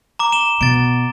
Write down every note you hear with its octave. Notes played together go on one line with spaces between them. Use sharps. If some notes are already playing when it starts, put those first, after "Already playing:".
A#5 D6
E7 G7
B2 A6 D7